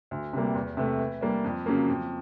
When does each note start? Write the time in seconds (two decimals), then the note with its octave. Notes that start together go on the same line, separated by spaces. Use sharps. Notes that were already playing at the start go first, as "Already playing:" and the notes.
0.11 D2
0.33 C3 E3 G3 A#3
0.55 E2
0.77 C3 E3 A3
0.99 E3
1.21 G3 A#3 D4
1.44 F2
1.66 C#3 F#3 A#3
1.88 F2